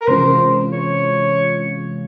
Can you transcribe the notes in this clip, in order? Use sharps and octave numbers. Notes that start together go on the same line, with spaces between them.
A#4
C3 E3 G#3 C#4 F4 C5
C#5